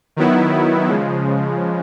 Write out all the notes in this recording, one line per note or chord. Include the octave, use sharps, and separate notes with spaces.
D#3 F#3 B3 E4
C#3 F3 G#3